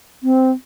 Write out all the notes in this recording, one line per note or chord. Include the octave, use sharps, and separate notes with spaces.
C4